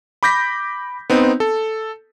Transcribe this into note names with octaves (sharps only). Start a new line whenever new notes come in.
B5 D6 G6 A#6 B6
B3 C4 D#4
A4